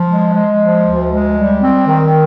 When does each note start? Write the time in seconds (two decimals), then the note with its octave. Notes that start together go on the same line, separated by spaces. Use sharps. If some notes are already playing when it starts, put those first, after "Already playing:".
Already playing: F3
0.09 G#3
0.34 G#3
0.60 F3
0.86 D2
1.10 G#3
1.36 G3
1.62 C4
1.87 D#3